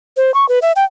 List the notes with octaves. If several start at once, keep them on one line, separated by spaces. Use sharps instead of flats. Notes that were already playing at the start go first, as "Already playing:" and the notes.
C5
C#6
B4
E5
G5